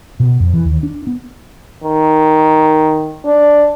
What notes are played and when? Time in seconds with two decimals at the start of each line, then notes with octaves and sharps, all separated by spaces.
0.20 B2
0.40 F2
0.53 E3
0.65 D#2
0.83 D4
1.07 B3
1.83 D#3
3.25 D4